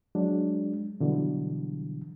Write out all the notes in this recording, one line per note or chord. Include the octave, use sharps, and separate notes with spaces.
F#3 G#3 D4
B2 D3 E3 F#3 G3